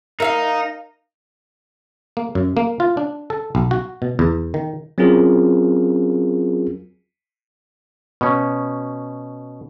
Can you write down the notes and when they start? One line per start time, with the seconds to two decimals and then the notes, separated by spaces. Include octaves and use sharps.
0.20 D#4 A#4 E5 F5
2.17 A#3
2.35 F#2
2.57 A#3
2.80 F4
2.97 D4
3.30 A4
3.55 B1
3.71 F#4
4.02 B2
4.19 E2
4.54 D#3
4.98 F#3 C4 C#4 F4 G#4 A#4
8.21 B2 C#4